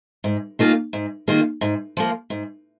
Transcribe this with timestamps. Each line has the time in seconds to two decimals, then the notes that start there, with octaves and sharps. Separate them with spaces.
0.24 G#2
0.59 D#3 A#3 F4 G#4
0.93 G#2
1.28 D#3 A#3 F4 G#4
1.61 G#2
1.97 F3 A#3
2.30 G#2